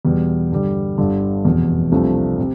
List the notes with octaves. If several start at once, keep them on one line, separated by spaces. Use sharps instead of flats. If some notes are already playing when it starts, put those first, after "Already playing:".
E2 B2 G3
G2 D3 G3
G1 G2 D3 G3
F1 E2 B2
C2 C3 F3 A3 D4
C3